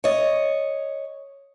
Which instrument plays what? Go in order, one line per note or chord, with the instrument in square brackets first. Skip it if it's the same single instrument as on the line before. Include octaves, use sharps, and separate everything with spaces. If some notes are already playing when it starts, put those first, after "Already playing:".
[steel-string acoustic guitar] C#5 D#5